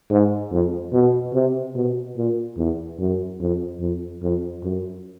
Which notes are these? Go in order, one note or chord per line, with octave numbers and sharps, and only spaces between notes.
G#2
F2
B2
C3
B2
A#2
E2
F#2
F2
F2
F2
F#2